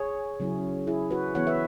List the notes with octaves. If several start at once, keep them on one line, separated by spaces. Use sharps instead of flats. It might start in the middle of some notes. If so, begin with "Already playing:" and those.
Already playing: G#4 C#5
C#3 F#3 C#4 E4
E4 G#4
F#4 B4
E3 B3 E4 C#5 F#5
B4 E5